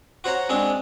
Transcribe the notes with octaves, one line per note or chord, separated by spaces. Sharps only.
F#4 C5 C#5 A#5
G#3 C4 D4 G#4